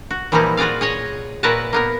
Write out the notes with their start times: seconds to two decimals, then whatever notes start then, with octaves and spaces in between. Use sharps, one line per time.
0.11 F#4
0.32 A#2 E3 F3 G3 D#4 E4
0.57 F4 F#4 G#4 D5 F5
0.81 G#4 C#5 D#5
1.43 A#2 E4 F#4 A#4 B4 A5
1.73 A#3 B3 A#4